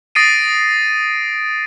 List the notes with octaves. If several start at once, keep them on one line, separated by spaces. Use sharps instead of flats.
D#6 A6 A#6 C7 D7 D#7